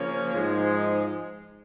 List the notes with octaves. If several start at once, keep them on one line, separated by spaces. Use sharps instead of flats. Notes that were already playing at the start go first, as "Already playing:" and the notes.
Already playing: C#3 F3 A#3 C#4
G#2 F3 G#3 D#4